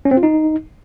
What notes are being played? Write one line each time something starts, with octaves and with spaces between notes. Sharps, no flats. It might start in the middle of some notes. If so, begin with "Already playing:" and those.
C#4
C4
F4
D#4